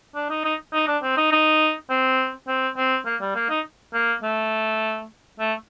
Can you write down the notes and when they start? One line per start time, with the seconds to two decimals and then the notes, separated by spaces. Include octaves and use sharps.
0.15 D4
0.30 D#4
0.44 D#4
0.73 D#4
0.88 D4
1.03 C4
1.17 D#4
1.32 D#4
1.90 C4
2.48 C4
2.77 C4
3.06 A#3
3.21 G3
3.35 A#3
3.50 D#4
3.94 A#3
4.23 A3
5.39 A3